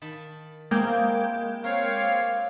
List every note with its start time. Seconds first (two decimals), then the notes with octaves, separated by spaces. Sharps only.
0.02 D#3 A5 B5
0.71 G#3 A#3 C4 E4 F4 G5 G6
1.64 C4 A#4 C#5 F5
1.95 F4 D5